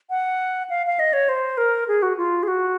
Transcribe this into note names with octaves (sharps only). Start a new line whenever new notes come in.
F#5
F5
F5
D#5
C#5
C5
A#4
G#4
F#4
F4
G#4
F#4